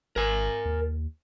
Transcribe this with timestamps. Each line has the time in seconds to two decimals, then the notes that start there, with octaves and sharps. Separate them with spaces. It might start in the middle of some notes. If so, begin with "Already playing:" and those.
0.16 G#1 A#4 G#5
0.65 D#2